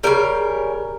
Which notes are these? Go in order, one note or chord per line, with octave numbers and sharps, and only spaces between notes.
C#3 E3 G3 A#4